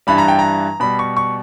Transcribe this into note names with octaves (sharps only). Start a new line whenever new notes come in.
G2 E3 G3 B5
A#5
G5
A#5
B2 G3 B5
C#6
C#6